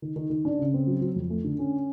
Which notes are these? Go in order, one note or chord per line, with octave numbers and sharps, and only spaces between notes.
D#3
D#3
D#3
D4
C#3
C4
F#3
F#3
F2
A3
D3
C#4